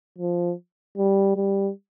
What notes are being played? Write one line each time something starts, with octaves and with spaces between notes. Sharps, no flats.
F3
G3
G3